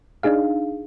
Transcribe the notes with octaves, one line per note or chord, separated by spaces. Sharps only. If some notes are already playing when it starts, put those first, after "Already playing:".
D4 D#4 G#4 F5